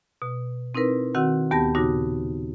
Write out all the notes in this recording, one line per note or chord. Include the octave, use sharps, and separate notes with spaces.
B2
C4 D#4 E4 A#4 B4
D#3 C4 F#4 F#5 E6
D#2 B3 G4 F#5 A5 A#6
A#2 C#3 D#4 F#4 A#6